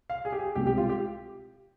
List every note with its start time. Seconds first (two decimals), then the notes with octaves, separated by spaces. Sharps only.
0.10 F5
0.25 G#4
0.32 G4
0.39 G#4
0.55 C2 B2 G#3 C4 G4
0.67 G4
0.78 F4
0.89 G4